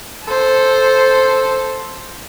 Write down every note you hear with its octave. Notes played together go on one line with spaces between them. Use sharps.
A4 C5